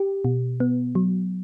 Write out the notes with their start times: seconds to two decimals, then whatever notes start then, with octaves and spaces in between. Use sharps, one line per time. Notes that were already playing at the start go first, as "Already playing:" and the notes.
Already playing: G4
0.25 B2
0.60 B3
0.95 F#3